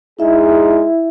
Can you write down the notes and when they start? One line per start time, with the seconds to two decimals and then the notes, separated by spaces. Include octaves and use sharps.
0.19 G#3 D#4 E4 G#4 E5